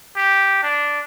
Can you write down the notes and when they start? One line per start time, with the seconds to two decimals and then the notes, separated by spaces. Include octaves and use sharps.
0.16 G4
0.63 D4